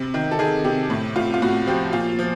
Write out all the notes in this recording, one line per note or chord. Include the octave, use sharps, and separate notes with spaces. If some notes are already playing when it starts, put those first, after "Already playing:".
Already playing: C3
D#3
A4
D#3 G#4
C3 G4
A2
A2 F4
F4
A2 F#4
F3 G4
A#2 F4
F3